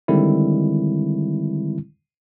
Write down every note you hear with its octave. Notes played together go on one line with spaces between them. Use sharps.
D3 D#3 G3 G#3 C4 E4